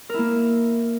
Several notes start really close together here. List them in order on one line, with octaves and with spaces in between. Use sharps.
A#4 E4 A#3